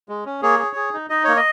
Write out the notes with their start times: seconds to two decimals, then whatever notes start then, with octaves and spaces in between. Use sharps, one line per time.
0.09 G#3
0.25 C#4
0.42 A#3 G#4 C#5
0.59 G#4
0.76 G#4
0.94 D#4
1.10 D#4 D#5
1.24 A#3 C#5
1.36 D#5